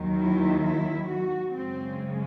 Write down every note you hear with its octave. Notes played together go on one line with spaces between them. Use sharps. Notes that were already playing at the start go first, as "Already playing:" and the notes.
Already playing: D#2 D#3 F#3
E4
E4
F#4
F#2 C#3 G#3 C4